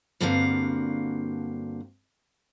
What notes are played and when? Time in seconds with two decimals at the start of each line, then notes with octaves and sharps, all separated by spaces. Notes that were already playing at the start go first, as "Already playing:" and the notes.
0.21 G2 D3 A#3 C4 F#4 F5